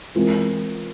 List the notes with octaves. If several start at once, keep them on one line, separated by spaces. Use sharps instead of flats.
E3 G#3 C4 F4 A#4